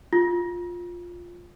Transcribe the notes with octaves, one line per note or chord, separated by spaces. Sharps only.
F4